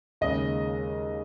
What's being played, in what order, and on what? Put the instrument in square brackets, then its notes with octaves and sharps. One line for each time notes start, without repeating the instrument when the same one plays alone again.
[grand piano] D#2 C#3 G#3 D#5